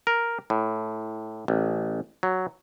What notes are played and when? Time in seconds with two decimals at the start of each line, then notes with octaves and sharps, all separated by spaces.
0.07 A#4
0.50 A2
1.48 A1
2.23 F#3